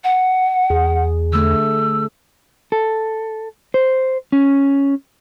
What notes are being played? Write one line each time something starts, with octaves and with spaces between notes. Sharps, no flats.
F#5
E2 G#4
D3 A3 E6
A4
C5
C#4